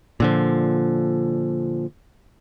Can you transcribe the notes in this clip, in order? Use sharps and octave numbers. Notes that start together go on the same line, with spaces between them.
A#2 D3 F3